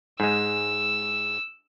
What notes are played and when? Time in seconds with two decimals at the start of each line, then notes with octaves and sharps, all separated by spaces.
0.20 G#2 G#3 E6